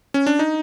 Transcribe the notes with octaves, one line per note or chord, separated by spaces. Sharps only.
C#4
D4
D#4